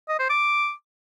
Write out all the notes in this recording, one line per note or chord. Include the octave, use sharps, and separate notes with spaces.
D#5
C5
D6